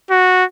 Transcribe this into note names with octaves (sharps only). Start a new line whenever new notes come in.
F#4